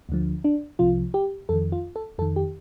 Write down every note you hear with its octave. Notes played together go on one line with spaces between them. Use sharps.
D2 D3 F3
D4
C2 C3 F3 F4
G4
F2 D#3 A4
F4
A4
F2 D#3 A4
G4